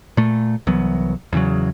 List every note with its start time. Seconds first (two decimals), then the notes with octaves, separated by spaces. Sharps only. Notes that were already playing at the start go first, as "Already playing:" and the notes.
0.17 A#2 A3
0.67 C2 E3 F#3 B3
1.33 E2 C#3 F#3